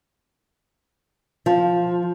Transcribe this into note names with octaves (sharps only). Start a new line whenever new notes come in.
F3